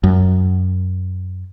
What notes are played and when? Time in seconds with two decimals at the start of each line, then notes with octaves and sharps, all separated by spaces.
0.03 F#2